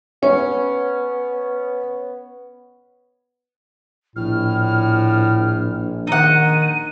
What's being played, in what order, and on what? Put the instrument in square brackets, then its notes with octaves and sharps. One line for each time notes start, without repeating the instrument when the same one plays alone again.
[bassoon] B3 [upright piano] C#4 [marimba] C#5
[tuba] A#1 [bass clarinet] A2 [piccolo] F6
[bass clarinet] D#3 [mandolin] D#4 F#5 [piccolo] D#7